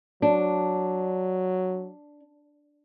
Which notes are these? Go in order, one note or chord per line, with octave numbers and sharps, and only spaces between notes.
F#3 D4